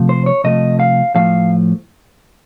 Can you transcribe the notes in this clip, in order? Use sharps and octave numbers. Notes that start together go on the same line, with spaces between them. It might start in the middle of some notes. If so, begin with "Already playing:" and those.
Already playing: C3 F3 A3
C5
C#5
C3 F3 A3 D#5
F5
A2 F3 A3 F5